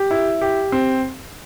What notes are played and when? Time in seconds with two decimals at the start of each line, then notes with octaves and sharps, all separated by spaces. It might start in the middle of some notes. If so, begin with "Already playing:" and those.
Already playing: G4
0.11 E4
0.41 G4
0.72 C4